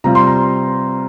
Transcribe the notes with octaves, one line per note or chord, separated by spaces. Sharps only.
C3 G3 C4 F4 A#5
C6
A#5